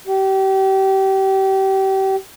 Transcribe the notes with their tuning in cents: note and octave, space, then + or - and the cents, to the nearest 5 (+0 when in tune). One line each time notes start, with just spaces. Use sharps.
G4 -30